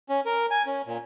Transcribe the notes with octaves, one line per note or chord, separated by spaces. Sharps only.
C#4
A#4
G#5
C#4
A#2